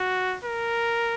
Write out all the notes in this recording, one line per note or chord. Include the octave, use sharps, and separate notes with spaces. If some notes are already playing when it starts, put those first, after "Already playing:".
Already playing: F#4
A#4